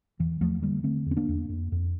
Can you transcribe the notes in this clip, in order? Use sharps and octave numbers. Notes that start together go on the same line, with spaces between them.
E2 E3
E2 F3 A3
D3 G3 A#3
D3 A3 C4
E2
C4
A#3 D4
E2
F2
F2